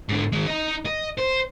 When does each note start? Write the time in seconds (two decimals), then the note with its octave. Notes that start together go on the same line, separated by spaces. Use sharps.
0.09 G#2 D3
0.32 D#3 G#3
0.46 D#4 D#5
0.85 D#5
1.18 C5